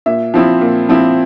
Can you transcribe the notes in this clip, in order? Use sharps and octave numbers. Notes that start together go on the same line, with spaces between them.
A#2 E5
F3 C4 E4
A#2
F3 C4 E4